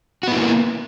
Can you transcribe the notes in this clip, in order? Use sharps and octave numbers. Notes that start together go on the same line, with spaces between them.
A#3 B3 E4 F#4